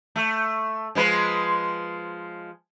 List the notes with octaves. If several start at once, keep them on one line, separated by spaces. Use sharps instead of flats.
A3
F3 G#3 B4